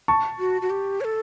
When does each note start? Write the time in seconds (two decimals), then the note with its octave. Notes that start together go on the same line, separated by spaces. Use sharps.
0.08 A5 C#6
0.39 F#4
0.62 F#4
0.70 G4
1.01 C#5
1.04 A4